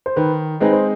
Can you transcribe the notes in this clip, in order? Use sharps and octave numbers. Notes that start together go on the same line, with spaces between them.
C5
D#3 B4
G#3 C4 D#4 G#4 B4
C5